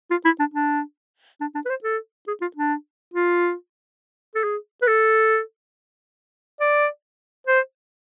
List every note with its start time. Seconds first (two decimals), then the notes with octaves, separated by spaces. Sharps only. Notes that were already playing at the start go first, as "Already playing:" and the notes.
0.11 F4
0.25 E4
0.39 D4
0.54 D4
1.41 D4
1.55 D4
1.65 B4
1.70 C5
1.84 A4
2.27 G#4
2.41 F4
2.56 D4
3.14 F4
4.35 A4
4.43 G#4
4.82 B4
4.87 A4
6.60 D5
7.47 C5